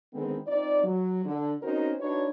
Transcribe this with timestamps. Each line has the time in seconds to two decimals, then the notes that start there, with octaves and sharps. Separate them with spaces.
0.14 D3 D#3 G#3 B3 C4
0.47 C4 D#4 F4 D5
0.84 F#3
1.24 D3
1.63 C4 C#4 D#4 F#4 A#4 C5
1.99 D4 D#4 F#4 B4 C#5